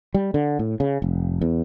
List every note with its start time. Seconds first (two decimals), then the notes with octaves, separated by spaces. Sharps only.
0.14 G3
0.34 D3
0.59 A2
0.80 C#3
1.02 F1
1.41 E2